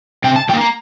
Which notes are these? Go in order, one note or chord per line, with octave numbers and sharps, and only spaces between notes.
C3 G5
A5
F3 G5
A#3
A#5